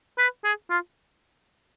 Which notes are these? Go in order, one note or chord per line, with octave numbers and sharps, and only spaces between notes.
B4
G#4
F4